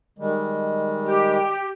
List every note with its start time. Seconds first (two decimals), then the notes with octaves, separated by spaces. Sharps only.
0.19 D#3 G3 G#3
1.05 G4